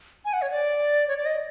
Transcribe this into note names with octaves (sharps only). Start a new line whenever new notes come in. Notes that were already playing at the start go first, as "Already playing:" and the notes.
G#5
F#5
C#5
D5
C#5
D5
D#5